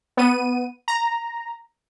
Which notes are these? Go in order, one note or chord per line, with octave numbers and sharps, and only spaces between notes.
B3 D#7
A#5